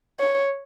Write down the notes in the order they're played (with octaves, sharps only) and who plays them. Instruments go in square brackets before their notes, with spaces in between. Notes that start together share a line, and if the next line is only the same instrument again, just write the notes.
[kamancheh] C#5